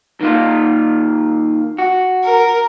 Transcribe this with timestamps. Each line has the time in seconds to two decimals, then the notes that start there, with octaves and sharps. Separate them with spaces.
0.21 D#3 A#3 F4
1.78 F#4
2.23 A#4